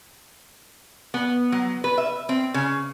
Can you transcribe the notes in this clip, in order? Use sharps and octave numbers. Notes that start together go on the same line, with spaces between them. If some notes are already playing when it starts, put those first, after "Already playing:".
B3
F#3
B4
E5
C4
C#3